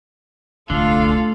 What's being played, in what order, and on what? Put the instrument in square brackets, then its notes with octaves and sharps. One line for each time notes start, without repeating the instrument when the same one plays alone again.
[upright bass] D1 C2 [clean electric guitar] D3 [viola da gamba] A3 [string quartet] F4 A4 F5